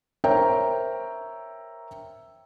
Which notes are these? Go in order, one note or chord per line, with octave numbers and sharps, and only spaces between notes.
A#4 C5 C#5 E5 G5 A#5